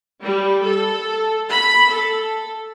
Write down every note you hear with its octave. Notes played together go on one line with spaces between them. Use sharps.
G3
A4
B5
A4